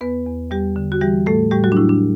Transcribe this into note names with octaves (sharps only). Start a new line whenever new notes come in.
E2 B3 B4
E2
E2 G3 G4
D3
F#4
E3 G3 G4
A2 A3 A4
A2 G3 G4
F#3 F#4
D4
A2 E4
D4